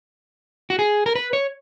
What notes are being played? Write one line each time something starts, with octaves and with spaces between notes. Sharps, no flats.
F#4
G#4
A#4
B4
C#5